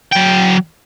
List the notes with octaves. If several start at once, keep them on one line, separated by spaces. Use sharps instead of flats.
F#3 G5